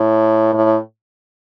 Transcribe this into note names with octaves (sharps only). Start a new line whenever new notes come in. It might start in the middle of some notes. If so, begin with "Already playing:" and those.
Already playing: A2
A2